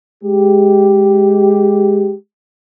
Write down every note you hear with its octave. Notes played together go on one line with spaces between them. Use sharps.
G#3 G4